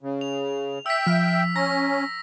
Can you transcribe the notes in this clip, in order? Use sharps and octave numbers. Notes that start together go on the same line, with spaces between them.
C#3
F7
E5 G5 E6 B6
F3 F6
C#4 A#5 A#6